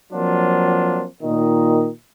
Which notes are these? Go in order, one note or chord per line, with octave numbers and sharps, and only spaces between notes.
F3 F#3 A#3 C4 D4 F4
A#2 D#3 D#5